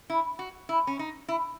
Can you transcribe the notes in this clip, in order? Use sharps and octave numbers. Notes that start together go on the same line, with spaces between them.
E4
F#4
E4
C#4
D#4
E4